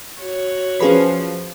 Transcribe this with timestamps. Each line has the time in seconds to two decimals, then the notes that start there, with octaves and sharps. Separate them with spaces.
0.20 F#4 C#5
0.80 F3 C#4 G#4 B4